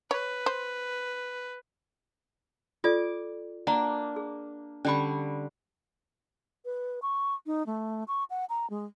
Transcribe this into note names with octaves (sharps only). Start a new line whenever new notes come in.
B4 C#5
C5
F4 A4 D5 D6
A#3 D4 F#5 A#5
G#4
D3 G3 C#4 B5 C#6
B4
C#6
D#4
A3
C#6
F#5
A#5
G#3